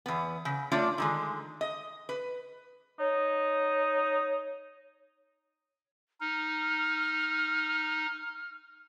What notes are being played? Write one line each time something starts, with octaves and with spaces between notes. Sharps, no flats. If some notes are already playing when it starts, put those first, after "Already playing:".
E2 B3
C#3
A3 D4 F4 C#5 D5
D3 D#3 G#3
D#5
B4
D#4 C#5
D#4 F6